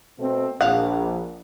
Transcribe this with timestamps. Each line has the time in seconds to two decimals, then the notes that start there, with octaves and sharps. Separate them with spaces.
0.19 B2 A3 C4
0.61 A#1 F5 F#5